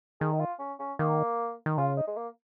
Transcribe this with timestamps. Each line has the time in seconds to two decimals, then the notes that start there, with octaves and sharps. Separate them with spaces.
0.21 D#3 G#4
0.33 D#4
0.40 F4
0.59 C#4
0.79 C#4
0.99 D#3 A#3
1.66 D#3
1.78 C#3 F4
1.97 D#4
2.07 G#3
2.17 A#3